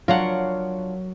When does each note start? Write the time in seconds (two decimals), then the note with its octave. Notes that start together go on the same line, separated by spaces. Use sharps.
0.08 F#3 D4 F4 A#4 C#5 F5 F#5